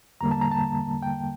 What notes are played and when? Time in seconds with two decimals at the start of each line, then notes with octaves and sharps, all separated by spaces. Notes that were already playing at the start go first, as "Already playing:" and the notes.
0.21 E2 D3 G3 A#3 A#5
0.31 A5
0.41 A#5
0.51 A5
1.03 G5